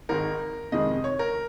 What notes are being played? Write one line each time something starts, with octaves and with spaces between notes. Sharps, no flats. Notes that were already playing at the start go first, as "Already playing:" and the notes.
G#1 G#2 D#3 G#3 A#4
F2 C3 D#3 G#3 D#5
C#5
A#4